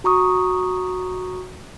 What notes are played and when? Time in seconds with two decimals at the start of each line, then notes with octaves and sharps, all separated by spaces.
0.04 F#4 A#5 C#6 D#6